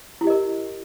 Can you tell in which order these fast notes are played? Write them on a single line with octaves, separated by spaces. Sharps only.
E4 G4 D#5 A#4